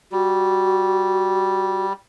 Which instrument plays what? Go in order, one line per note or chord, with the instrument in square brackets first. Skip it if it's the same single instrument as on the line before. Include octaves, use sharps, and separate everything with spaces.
[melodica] G3 [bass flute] F#4